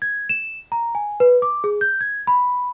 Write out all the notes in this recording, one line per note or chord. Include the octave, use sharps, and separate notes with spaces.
G#6
E7
A#5
G#5
B4
D6
G#4
G6
G#6
B5